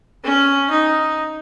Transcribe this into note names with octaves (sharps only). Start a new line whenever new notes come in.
C#4
D#4